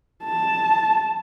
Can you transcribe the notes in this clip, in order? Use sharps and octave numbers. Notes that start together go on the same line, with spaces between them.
A5